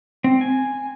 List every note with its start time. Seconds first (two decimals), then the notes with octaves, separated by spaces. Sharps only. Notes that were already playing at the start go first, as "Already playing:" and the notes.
0.24 C4
0.41 G#5